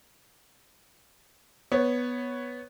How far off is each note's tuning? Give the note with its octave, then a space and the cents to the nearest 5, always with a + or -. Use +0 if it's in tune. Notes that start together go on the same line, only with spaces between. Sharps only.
B3 +0 C#5 +0